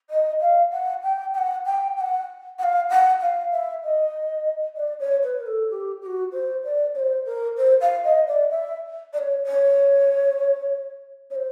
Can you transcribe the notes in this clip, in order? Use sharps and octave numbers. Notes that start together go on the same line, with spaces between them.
D#5
F5
F#5
G5
G5
F#5
G5
G5
F#5
F#5
F5
F#5
F5
E5
D#5
D5
C#5
B4
A#4
A4
G4
G4
F#4
C5
D5
C#5
C5
A#4
C5
F5
D#5
D5
E5
D5
C#5
C#5
C#5
C5